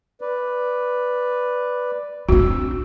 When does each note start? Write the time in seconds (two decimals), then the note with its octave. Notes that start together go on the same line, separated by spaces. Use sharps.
0.21 B4 D5
2.29 C4 D4 F#4 E6